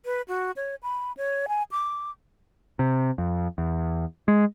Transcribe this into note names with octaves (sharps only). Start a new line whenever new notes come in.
B4
F#4
C#5
B5
C#5
G#5
D6
C3
F2
E2
G#3